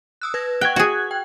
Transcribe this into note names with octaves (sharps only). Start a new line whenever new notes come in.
D#6 E6 F#6
B4 G#6 A#6
F#5 G5 C#6 F#6 G#6
F#4 G#4
G5